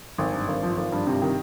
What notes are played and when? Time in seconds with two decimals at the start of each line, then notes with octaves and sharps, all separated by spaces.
0.18 G#1
0.33 G2
0.48 G#1
0.63 F3
0.78 G#1
0.92 G2
1.07 C3
1.22 D#3